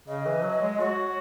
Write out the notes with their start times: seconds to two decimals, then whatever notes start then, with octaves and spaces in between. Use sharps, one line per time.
0.08 C#3 D#5
0.26 E3
0.44 F#3
0.62 G#3
0.80 F#4 C#5